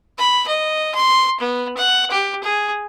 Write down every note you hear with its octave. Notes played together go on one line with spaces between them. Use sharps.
B5
D#5
C6
B3
F#5
G4
G#4